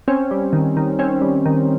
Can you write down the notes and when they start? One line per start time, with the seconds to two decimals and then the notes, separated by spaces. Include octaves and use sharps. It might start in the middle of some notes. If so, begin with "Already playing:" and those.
0.08 C4 C#4
0.31 G3
0.53 D#3
0.77 D#3
0.99 C4 C#4
1.22 G3
1.46 D#3